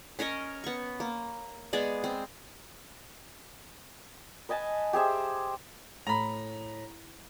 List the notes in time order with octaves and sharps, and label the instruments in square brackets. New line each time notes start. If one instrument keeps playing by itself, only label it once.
[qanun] C#4 A#4 C#5 D#5
B3 C#6
A#3
G#3 B3 G#4 D5
C4
[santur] B4 D#5 G#5 A5
G4 G#4 C5 E5
[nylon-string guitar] A2 [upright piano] A#5 B5